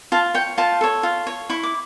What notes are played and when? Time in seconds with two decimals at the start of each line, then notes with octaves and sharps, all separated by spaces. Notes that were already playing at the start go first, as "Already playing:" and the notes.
0.12 F4 A5
0.34 C#5 G5
0.58 F4 A5
0.81 A4 C#5
1.03 F4
1.27 C#5
1.50 E4 C#6
1.63 D6